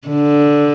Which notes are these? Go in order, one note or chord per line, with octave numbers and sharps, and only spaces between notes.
D3